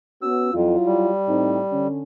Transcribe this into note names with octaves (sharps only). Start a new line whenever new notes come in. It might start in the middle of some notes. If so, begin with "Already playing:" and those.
B3 C#4 F#4 E6
F2 F#3 E4 F4
G3
A2 C4 D#4
D3 C#4